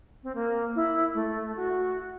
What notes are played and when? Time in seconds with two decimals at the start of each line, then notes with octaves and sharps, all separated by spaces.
0.23 C4
0.35 A#3
0.76 E4
1.14 A3
1.56 F#4